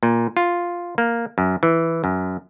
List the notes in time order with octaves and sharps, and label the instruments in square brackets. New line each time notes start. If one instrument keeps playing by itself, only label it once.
[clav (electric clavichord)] A#2
F4
A#3
F#2
E3
F#2